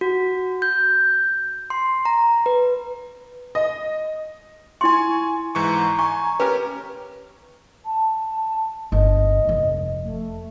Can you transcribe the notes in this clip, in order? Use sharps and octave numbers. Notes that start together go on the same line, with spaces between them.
F#4
G6
C6
A#5
B4
D#5
E4 G#5 C6 C#6
G#2 E3 A#5 C#6
G#5 C#6
C#4 G4 A#4 B4 B5
A5
G1 D#5
F1 F2
A3